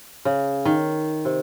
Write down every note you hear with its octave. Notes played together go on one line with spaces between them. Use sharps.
C#3
D#3
C3